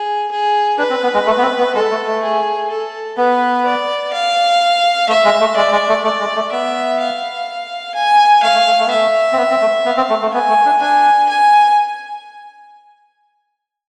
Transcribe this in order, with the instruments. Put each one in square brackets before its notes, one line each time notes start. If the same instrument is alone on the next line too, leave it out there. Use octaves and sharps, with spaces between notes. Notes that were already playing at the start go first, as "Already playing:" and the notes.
Already playing: [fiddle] G#4
G#4
[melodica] D4 [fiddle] B4
[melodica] C4
B3
G#3
A3
B3
C4
B3
[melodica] G#3 [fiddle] A4
[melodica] A3
A3
[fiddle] G#4
A4
[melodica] B3 [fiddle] B4
[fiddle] D5
F5
[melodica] A3 [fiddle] E5
[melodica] G#3
A3
[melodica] G#3 [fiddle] D5
[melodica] G#3
A3
[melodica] A3 [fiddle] D5
[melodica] G#3
A3
[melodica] B3 [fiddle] E5
[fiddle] F5
G#5
[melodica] A3 [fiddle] F5
[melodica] A3
A3
A3
B3
[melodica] A3 [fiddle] E5
[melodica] C4
B3
C4
A3
[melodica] B3 [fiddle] F5
[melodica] C4
A3
A3
[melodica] B3 [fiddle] G#5
[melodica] A3
D4
[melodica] D4 [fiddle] G#5
[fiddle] G#5